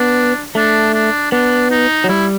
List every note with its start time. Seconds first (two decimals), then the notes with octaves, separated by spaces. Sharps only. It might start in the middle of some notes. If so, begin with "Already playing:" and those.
Already playing: B3 D4
0.55 A3 D4
0.94 D4
1.32 B3 D4
1.70 D#4
2.04 F#3
2.09 G3 E4